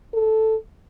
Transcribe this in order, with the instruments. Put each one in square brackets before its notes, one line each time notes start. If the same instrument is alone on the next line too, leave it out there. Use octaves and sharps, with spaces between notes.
[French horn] A4